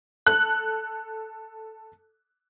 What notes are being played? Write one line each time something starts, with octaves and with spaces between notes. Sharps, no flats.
A4 F#6